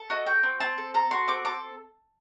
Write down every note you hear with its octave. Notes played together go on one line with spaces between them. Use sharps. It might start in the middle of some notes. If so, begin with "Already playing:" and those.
Already playing: A4
F#4 D#5
F#4 G5
C4
C4 A5
A4
A4 A#5
F#4 C6
C4 D6
A4 D6